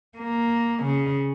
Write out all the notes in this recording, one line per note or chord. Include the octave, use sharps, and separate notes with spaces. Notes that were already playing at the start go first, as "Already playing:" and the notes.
A#3
C#3